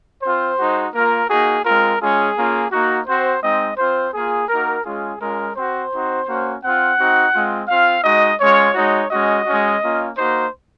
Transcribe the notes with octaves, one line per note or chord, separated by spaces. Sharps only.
C4 F4 C5
G#3 D#4 F#4
A#3 F4 A#4
A#3 D#4 F#4 G#4
G#3 C4 F4 A#4
G#3 C#4 F4 G#4
A#3 C#4 F4
A#3 D#4 F#4
C4 F#4 C5
G#3 C4 D#4 D#5
C4 F4 C5
A#3 F4 G#4
A#3 D#4 F#4 A#4
G#3 C#4 F4 G#4
G#3 C#4 F4 A#4
C4 F#4 C5
C4 D#4 F#4
A#3 C#4 F#4
C4 F4 F#5
C4 D#4 F#4
G#3 C4 F4
C4 F4 F5
G#3 D#4 F#4 D#5
G#3 C#4 F4 C#5
G#3 D#4 F#4 C#5
G#3 C#4 F#4 D#5
G#3 C#4 F#4
A#3 C#4 F4
A#3 D#4 F#4 C5